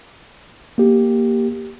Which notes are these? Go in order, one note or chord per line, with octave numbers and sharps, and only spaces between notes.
A#3 G4